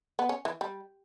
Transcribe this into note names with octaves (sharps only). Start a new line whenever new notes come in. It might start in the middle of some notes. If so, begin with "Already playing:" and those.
B3
C#4
E3
G3